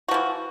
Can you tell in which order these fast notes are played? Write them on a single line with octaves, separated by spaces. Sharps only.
F#4 F3 E3